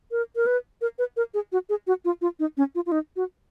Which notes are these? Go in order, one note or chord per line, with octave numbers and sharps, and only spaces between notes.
A#4
A#4
B4
A#4
B4
A#4
G#4
F#4
G#4
F#4
F4
F4
D#4
C#4
F4
F4
D#4
F#4